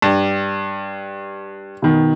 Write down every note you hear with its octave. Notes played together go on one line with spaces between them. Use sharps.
G2
B2 D#3